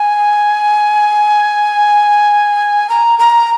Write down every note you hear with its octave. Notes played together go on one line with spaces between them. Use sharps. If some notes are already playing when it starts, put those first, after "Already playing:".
Already playing: G#5
A#5
A#5